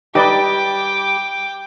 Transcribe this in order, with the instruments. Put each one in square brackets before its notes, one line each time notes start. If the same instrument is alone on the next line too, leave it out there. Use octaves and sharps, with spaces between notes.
[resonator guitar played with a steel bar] G3 G4 [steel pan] D#4 B4 D5 [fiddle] G5 D6